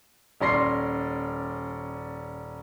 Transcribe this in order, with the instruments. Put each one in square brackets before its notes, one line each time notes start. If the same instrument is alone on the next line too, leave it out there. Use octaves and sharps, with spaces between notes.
[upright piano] D#1 C#4 D5 C6 A#6 C7